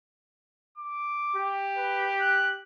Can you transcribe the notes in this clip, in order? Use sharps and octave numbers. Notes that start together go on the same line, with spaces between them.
D6
G4
B4
F#6